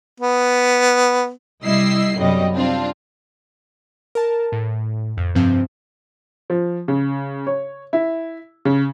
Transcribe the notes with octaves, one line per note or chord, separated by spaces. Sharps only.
B3
C3 G3 E4 D#5 E6 C7
B1 F#2 C3 G3 D#5
G3 C4 D4 F4
A#4 A5
A2
F2
G2 C3 F3 C4
F3
C#3
C#5
E4
C#3